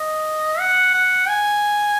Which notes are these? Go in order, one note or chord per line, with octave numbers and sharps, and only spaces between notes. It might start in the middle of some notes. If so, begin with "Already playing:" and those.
Already playing: D#5
F#5
F#5
G#5